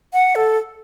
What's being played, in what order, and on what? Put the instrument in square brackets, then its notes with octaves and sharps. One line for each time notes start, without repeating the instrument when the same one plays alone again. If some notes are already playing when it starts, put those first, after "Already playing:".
[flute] F#5
A4